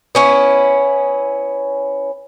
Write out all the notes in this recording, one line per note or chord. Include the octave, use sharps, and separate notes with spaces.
B3 C#4 E4